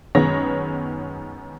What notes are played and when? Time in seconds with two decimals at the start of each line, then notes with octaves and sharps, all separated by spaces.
0.15 F#2 D#3 G#3 B3 C#5 A#6